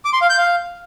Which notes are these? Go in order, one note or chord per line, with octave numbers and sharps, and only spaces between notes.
D6
C6
F5
G6
F5